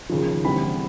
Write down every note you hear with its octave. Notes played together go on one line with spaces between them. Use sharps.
D#2 C#3 F3
D2 C3 E3 G3 C4 B5